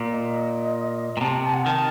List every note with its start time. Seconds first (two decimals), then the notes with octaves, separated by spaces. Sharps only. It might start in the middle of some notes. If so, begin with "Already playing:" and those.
Already playing: A#2
0.10 D#5
1.17 A#2
1.21 C3 A5
1.43 A5
1.53 F#5
1.64 D#3 A5